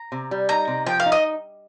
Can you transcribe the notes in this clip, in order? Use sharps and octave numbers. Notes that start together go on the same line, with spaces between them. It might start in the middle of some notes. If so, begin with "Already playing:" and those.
Already playing: A#5
C3
G3
D#4 A#5
C3
F3 G5
F5
D#4
D#5